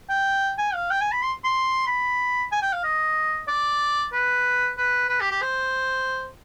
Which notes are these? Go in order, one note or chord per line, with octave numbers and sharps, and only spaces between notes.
G5
G#5
F5
G5
G#5
B5
C6
C6
B5
G#5
G5
F5
D#5
D5
B4
B4
B4
G4
G4
C5